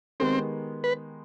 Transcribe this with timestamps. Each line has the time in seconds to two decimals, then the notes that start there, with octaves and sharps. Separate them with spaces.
0.20 D#3 G#3 B3 C4 D#4 G4
0.84 B4